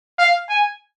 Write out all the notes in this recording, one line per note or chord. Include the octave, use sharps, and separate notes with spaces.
F5
G#5